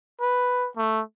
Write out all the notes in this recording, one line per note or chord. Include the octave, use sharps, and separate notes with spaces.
B4
A3